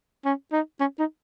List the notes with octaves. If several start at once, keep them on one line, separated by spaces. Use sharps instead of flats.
C#4
D#4
C#4
D#4